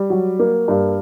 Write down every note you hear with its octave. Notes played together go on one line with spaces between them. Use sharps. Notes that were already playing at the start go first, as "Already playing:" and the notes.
Already playing: G3
F#3
A#3
G2